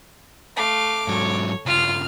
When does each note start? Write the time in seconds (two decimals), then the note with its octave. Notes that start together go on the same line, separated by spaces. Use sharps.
0.56 A3 F5 D6
1.08 G#2 F#3 C#5
1.66 G2 C#3 F4 F6